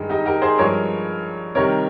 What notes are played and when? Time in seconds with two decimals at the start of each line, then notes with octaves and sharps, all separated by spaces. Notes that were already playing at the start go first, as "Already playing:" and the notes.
Already playing: G2 D#3 G#3
0.09 D#4 G4
0.26 G4 A#4
0.42 G#4 C5
0.58 G2 F3 G#3 A#4 C#5
1.55 C3 D#3 G3 A#4 C#5